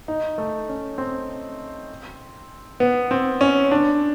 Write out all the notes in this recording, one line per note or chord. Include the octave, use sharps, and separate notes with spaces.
D#4
A3
C#4
C4
B3
C4
C#4
D4